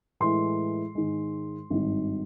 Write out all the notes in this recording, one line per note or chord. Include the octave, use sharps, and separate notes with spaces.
A2 E3 G#3 C6
G#2 D#3 G#3
G#1 G2 D#3